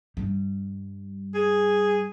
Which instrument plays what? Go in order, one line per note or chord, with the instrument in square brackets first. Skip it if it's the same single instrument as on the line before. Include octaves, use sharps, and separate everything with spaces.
[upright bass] G2 G3
[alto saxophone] G#4